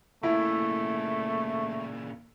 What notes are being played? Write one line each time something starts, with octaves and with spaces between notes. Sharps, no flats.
A#2 C#3 A3 E4